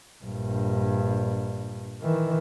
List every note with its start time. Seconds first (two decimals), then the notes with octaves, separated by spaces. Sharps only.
0.24 A#1 G2
2.02 D#3 E3